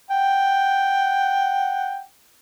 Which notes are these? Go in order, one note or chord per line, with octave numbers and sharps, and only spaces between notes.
F#5 G5